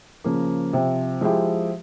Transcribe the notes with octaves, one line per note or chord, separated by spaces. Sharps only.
C#3 F3 A#3
C3 F3 C4
F3 G#3 E4 G4